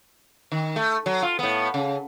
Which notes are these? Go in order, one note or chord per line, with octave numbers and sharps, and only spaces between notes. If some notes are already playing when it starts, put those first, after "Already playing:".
D#3
A3
F#3
F4
A2 B3
C#3